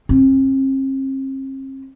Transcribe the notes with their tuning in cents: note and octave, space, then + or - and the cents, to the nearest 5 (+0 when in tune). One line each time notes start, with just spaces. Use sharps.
C4 +45